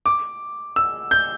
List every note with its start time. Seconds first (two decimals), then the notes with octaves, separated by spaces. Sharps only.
0.06 D6
0.76 E6
1.11 G6